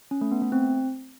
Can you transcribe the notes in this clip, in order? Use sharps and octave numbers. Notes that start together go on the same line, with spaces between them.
C#4
A3
B3
A3
C4